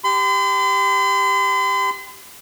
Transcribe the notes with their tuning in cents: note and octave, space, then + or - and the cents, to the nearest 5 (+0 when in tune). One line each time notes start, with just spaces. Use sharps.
G4 +0 C6 -45